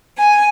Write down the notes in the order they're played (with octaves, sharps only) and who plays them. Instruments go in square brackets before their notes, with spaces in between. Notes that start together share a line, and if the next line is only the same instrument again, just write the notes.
[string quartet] G#5